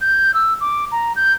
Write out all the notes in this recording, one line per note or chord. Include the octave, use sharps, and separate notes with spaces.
G6
E6
D6
A#5
G6